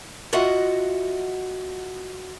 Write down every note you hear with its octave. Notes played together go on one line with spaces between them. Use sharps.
F4 F#4 D#5 E5 F#5